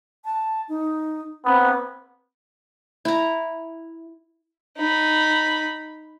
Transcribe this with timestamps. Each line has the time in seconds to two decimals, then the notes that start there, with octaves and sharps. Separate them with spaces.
0.24 A5
0.69 D#4
1.45 B3 C4
3.05 E4 A#5
4.77 D#4 B5